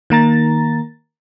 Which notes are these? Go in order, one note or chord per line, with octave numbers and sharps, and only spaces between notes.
D#3 A#3 A#5 A6